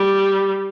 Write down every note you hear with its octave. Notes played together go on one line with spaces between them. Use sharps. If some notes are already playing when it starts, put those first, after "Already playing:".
Already playing: G3